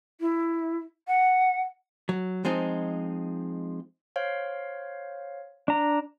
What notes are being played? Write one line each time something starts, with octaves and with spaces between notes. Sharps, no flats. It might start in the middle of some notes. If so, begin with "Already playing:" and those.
E4
F#5
F#3
F3 G#3 C4 D#4
C5 C#5 F5
D4 A#5